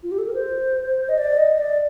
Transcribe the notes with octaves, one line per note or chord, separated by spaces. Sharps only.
F4
G4
A4
A#4
C5
D#5
D5
D#5
D5